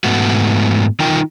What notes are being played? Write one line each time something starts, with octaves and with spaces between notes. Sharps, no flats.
G#2 A3 B3 F#4
D#3 D#4 F4 A#4 G5